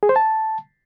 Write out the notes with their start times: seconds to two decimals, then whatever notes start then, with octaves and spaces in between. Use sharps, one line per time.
0.03 G#4
0.09 C5
0.16 A5